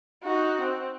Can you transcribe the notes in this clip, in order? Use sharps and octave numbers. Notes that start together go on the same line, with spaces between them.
D#4 F#4
C4